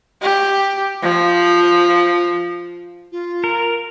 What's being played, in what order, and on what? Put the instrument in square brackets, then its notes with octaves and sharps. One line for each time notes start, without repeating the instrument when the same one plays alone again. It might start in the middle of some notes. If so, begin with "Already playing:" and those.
[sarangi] G4
F3
[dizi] F4
[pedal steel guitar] A#4